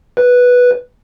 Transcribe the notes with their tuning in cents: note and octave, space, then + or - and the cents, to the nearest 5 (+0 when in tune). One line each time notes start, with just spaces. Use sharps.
B4 -5